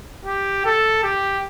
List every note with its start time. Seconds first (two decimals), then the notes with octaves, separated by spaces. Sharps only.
0.25 G4
0.65 A4
1.04 G4